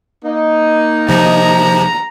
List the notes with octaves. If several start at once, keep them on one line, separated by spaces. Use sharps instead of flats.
A#3 D#4
C3 F3 A#5